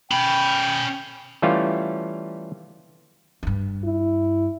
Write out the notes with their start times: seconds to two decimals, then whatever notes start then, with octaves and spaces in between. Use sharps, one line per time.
0.11 C#4 G5 B5
1.42 E3 G3 A3 C#4 F4
3.43 G2 D4
3.84 E4